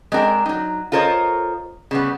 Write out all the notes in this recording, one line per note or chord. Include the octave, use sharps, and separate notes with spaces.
G#3 C4 D4 A#4 G5
F#3 D#4
F4 A4 A#4 C5 C#5 D#5
C#3 G3 B3